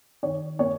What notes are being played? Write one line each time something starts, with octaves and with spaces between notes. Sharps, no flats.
D#3 C#5
A#3 C#5